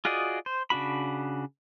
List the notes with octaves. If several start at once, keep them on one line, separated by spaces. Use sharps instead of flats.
F4 F#4 G#4 D5 D#5
C5
C#3 D4 F#4 B5